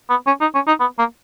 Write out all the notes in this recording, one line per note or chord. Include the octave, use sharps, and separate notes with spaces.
B3
C#4
D#4
C#4
D#4
B3
A#3